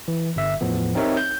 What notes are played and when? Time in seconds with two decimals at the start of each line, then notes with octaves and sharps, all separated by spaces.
0.08 E3
0.36 G1 E5
0.61 E2 A2 F3 B3
0.95 C4 D#4 G4 A#4 C#5 E5
1.17 G6